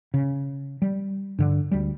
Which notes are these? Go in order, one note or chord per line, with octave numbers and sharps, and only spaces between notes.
C#3
G3
G2 D3
D2 G3